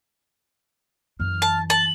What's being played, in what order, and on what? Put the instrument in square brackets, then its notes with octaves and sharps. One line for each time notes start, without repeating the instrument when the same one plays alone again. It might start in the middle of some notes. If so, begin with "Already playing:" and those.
[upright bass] F#2 E3 [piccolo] F6
[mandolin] A5
[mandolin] A5 [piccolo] F#7